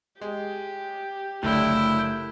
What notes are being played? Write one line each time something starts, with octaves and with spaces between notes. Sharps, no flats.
G#3 G4
F#1 A2 D3 E4 G5